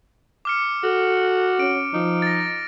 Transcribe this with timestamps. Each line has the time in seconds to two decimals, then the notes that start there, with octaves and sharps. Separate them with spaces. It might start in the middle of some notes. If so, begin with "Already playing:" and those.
0.45 D6 F6 C#7
0.84 F#4 A4
1.59 C#4 D7
1.94 F3 D#4
2.22 A6 A#6